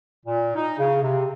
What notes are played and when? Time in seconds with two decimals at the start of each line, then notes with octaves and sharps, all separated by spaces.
0.25 A#2
0.56 D#4
0.77 C#3
1.02 C3